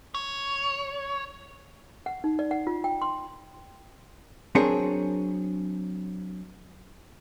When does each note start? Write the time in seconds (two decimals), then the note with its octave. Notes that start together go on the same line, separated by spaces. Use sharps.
0.15 C#5
2.06 F#5
2.24 D#4
2.39 D5
2.51 F#5
2.67 F4
2.84 G5
3.02 C6
4.55 F#3 C4 D4 G#4 A#4 C#5